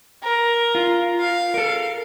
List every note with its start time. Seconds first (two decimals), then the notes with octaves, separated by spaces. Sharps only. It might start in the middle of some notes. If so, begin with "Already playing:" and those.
0.23 A#4
0.75 F4
1.20 F5
1.54 A4 A#4